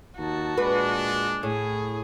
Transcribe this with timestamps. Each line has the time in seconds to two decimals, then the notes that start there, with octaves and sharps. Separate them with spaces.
0.18 D#2 D#4 F#4 A5
0.58 A#2 G#3 D4 B4
1.43 A2 G#4